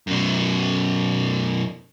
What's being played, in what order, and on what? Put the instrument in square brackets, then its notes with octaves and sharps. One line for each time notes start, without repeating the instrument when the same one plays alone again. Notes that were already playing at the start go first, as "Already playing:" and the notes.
[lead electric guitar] F#2 B2